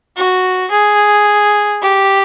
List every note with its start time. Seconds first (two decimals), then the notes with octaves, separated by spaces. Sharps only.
0.16 F#4
0.71 G#4
1.82 G4